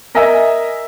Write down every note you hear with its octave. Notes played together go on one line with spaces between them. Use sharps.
A#4 D#5 E5 G#5 A#5 E6